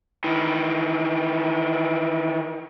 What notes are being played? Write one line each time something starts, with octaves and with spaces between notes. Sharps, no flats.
D#3 E3